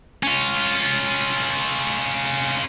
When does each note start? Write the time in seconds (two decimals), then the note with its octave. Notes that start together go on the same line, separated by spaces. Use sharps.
0.23 C#4 F4